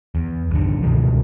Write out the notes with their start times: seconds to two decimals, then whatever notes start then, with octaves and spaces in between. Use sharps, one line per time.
0.15 E2
0.51 C2 G2 D3
0.83 C#2 B2 D#3 E3